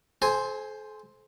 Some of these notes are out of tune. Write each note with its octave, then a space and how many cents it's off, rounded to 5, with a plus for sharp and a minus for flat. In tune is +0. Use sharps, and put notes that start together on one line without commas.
A4 -40 C5 +0 G#5 +0